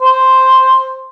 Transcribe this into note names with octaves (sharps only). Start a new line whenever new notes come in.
C5